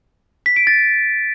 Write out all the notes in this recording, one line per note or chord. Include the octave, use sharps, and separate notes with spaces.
B6
D7
A6